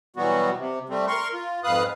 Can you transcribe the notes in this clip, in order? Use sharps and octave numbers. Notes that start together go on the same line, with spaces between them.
B2 E3 F#3 G3 B3 F#4
C3
G3 A3 C4
A#4 C6 C#6
F4
F2 G#2 B4 F5 D#6 F#6